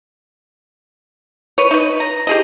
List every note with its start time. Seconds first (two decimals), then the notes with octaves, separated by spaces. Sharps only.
1.58 B4 C#5
1.71 D#4 B4
2.00 A#5
2.27 G4 G#4 D#5